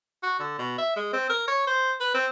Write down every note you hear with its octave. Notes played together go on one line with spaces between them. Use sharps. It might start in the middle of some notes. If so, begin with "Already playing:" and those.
F#4
D3
B2
E5
G#3
C4
A#4
C#5
C5
B4
C4